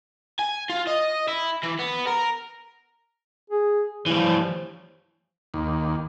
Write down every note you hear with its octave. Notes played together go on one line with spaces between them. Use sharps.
G#5
F4
D#5
E4
E3
B3
A#4
G#4
E3 F3 G3
D#2